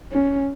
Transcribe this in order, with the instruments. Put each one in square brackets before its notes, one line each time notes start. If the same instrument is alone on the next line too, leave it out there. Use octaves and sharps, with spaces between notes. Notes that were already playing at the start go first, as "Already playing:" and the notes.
[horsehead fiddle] C#4